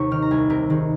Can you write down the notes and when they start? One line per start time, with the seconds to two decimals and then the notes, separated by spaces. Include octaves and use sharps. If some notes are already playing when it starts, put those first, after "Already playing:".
Already playing: D#2 C3 A#3 C#6
0.11 D#3 F6
0.22 A#5
0.31 C2 G#5
0.50 C3 A#4
0.70 D#3 G#4